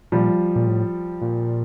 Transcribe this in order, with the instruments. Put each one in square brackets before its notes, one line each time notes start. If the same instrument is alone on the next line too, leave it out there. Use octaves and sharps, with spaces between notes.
[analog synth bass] A#2 [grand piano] F3 G3
[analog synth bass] A#2
A2
A#2